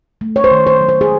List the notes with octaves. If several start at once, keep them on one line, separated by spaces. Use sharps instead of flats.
A3
C#5
C5
D#3
C5
F#3
C5
G#4